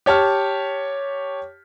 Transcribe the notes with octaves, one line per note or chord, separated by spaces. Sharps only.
G4 C#5 A5 F6